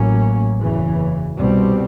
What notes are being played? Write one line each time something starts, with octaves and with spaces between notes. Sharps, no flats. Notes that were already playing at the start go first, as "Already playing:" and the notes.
Already playing: A1 A2 F#3 A#3 C#4
F#1 E2 C#3 E3
C2 B2 G3 C4